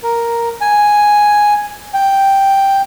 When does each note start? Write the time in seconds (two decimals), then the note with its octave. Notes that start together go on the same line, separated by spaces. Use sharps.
0.03 A#4
0.61 G#5
1.94 G5